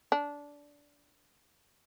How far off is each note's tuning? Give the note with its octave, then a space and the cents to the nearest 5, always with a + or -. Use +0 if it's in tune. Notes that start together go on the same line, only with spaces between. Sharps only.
D4 -15